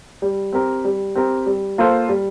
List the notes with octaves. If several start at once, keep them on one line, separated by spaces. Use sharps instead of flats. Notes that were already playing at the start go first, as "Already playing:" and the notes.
G3
C4 G4 A#4
G3
C4 G4 A#4
G3
A#3 F4 A4 C5
G3